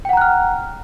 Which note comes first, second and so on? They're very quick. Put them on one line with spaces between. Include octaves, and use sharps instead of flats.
G5 F#5 A#5 F#6 F6